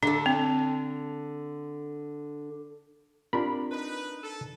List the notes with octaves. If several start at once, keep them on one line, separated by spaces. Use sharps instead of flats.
D3 D4 A4
C4
C4 D4 F4 G4 A#4 B5
D#4 B4
A4